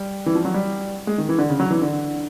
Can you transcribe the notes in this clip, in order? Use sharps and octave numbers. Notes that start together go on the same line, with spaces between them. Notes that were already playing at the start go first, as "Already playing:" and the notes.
Already playing: G3
E3
F3
F#3
G3
G#3
D#3
E3
D3
C#3
F#3
E3
D3